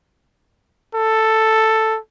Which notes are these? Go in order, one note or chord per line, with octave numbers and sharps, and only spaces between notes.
A4